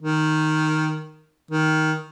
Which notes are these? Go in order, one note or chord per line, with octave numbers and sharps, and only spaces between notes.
D#3
D#3